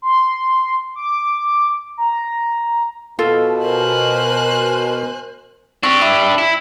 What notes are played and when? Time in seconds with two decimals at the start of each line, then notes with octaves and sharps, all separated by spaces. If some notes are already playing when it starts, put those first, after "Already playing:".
0.02 C6
0.95 D6
1.98 A#5
3.19 B2 F4 A4
3.62 A#4 C5 G#5 F#6
5.83 C4 D4 G4 C#6
6.01 E4 D6
6.38 E4